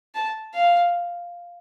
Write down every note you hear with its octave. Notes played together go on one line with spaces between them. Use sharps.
A5
F5